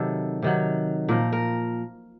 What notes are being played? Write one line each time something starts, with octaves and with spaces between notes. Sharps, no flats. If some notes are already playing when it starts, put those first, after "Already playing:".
Already playing: C3 D#3 F#3 A4
C3 D#3 F#3
A#2 F3 A#4
A#4